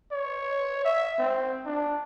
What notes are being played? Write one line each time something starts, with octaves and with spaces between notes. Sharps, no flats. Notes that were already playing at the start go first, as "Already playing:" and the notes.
C#5
E5
C4
D4